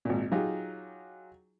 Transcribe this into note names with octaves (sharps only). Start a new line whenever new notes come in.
G#1 A#2
F#3 D#4 F4 G4 G#4